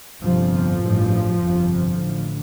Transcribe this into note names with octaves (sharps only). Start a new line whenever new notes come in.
G1 F2 C3 F3
A1 G2
G1 F2 C3
A1 A2 D3